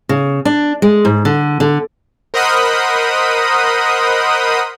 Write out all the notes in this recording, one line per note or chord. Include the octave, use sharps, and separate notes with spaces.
C#3
D4
G#3
G#2
D3
D3
A#4 C5 D#5 F#5 B5 D#6